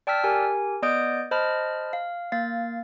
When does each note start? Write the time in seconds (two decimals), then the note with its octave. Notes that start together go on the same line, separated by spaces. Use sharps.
0.07 D5 G5 A5 E6 F6 B6
0.24 G4 A#4 G#5
0.82 B3 D5 D#5 D#6 G6 D7
1.31 C5 D#5 A5 B5 F6
1.93 F5
2.32 A#3 F5 A6